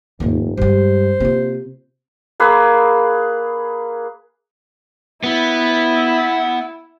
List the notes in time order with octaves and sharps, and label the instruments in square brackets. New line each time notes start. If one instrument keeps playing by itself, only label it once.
[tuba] F1 [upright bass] D#2 G#2
[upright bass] G2 G#3 [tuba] G3 [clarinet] C5
[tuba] C3 [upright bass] A#3 F4
[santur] A#3 G#4 B4
[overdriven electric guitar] B3 [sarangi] E4